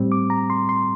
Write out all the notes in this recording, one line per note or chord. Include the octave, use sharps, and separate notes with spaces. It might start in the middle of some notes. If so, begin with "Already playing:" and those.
Already playing: A2 G3 C4
D6
A#5
C6
C6